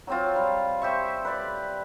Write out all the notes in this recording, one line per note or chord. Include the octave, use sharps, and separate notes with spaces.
F#3 C4 F4
G3
G4 C5 E5 C#6
B4 D5